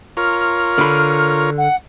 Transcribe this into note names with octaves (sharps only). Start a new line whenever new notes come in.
F4 A#4 C#5 F6
D3 B5
F#5